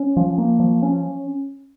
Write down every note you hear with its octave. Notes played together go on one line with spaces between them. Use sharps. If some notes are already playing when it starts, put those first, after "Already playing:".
Already playing: C#4
F3
A#3
F3
C#4